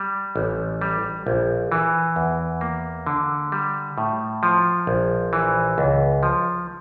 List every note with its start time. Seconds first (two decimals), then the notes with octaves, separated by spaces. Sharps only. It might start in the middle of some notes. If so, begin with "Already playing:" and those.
Already playing: G3
0.36 A1
0.81 G3
1.27 A#1
1.72 E3
2.16 E2
2.61 A#3
3.06 D3
3.52 G3
3.98 A2
4.43 F3
4.87 A#1
5.33 E3
5.78 C#2
6.23 F3